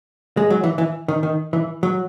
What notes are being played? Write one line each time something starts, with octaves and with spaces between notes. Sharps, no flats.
G#3
F#3
E3
E3
D#3
D#3
E3
F#3